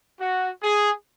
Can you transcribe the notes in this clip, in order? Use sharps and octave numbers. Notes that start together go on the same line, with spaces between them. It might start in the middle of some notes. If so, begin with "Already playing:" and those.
F#4
G#4